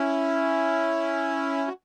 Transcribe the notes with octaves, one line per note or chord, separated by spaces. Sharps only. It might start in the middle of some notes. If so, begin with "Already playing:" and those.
Already playing: C#4 E4
F#4